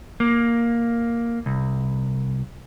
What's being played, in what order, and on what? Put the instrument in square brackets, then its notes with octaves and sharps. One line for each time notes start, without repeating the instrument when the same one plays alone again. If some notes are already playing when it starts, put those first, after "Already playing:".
[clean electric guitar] A#3
C2